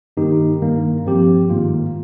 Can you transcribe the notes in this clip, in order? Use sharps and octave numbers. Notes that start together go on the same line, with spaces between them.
G2 D#3 A#3 D#4 G4
G2 D#3 A#3
G2 F3 C4 G4
G#2 D#3 A#3 F4